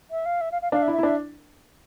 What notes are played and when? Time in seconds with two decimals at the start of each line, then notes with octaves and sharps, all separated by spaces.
0.11 E5
0.26 F5
0.41 E5
0.52 F5
0.62 F5
0.72 D4 F5
0.82 E5
0.88 E4
0.93 E5
0.99 E4
1.03 D4 E5